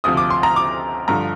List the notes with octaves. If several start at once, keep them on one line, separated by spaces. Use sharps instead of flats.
D2 C3 F3 D#6
D6
C6
A#5
D6
G2 D3 F3 A#5